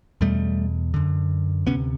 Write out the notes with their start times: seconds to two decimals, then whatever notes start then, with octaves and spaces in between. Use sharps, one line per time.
0.21 E2 B2 G3 A3
0.94 F#2 D3
1.66 D2 C3 B3 C#4